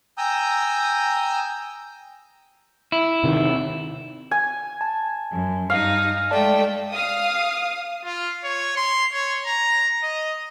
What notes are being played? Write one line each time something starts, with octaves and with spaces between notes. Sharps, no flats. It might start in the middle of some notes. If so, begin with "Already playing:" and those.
G5 G#5 A#5 D#6 E6 G6
E4
C3 D#3
G#5
A5
F#2
G2 D#4 F5
G#3 A3 D5 G5 A5
F5 D#6
F4
C#5
C6
C#5
A#5
D#5